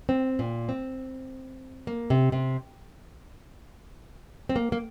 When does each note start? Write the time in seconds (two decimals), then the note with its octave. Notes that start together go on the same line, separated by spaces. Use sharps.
0.09 C4
0.39 A#2
0.69 C4
1.87 A#3
2.10 C3
2.32 C3
4.49 C4
4.56 A#3
4.72 A#3